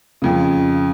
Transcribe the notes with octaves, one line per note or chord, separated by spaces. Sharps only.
F2 C#3